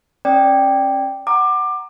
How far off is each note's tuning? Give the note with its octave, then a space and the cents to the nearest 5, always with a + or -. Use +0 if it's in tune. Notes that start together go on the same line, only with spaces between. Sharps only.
C#4 -30 D5 +0 G5 +0
F#5 +10 A#5 -10 D6 +20